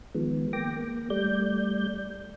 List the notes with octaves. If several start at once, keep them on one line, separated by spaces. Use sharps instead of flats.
D#3 F3 G#3 B3
A#3 G5 D6 A#6
A#3
G3 A3 D5 G6